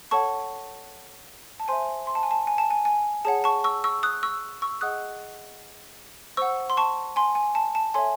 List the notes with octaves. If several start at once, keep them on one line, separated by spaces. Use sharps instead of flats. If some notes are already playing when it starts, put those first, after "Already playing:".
A4 C#5 F#5 A5 C#6
A5
C5 E5 G#5 C6
C6
A5
G#5
A5
G#5
A5
G#5
G#5
G#4 C#5 F#5 A5
A5 C#6
C#6 E6
C#6 E6
D#6 F#6
C#6 E6
C#6 E6
G#4 D#5 F#5 D#6 F#6
C5 F#5 C#6 E6
C6
A5 C#6
G#5 C6
G#5
A5
A5
A4 C#5 E5 G#5 C6